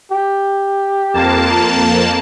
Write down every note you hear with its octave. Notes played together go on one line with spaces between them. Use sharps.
G4
F2 A#3 A5